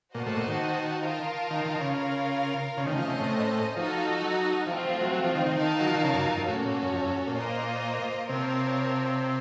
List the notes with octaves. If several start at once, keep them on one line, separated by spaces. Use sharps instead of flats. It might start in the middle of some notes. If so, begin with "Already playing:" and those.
A#2 F#4 C5 D#5 F#5 A5
A2
A#2
D#3
F4 A#4 F5 A5
D#3
D#3
C#3
F4 A#4 F5
C#3
D#3 A3 C#4 A4 C5 D#5
F3
C3
A2
F3 D#4 F#4 A4 D#5
F#3
F3 A3 C4 F4
F3
F3
F#3
F#3
F3
D#3
D#3
D#4 A#4 F5 A5
F#3
F3
D#3
C#3
F#2
F2
F#2
A2 C#4 F#4 A4 C#5
A#2
A#2
F#2
F2
F#2
A#2
A#3 F4 C5 D#5
C3 F4 A#4 C#5 A5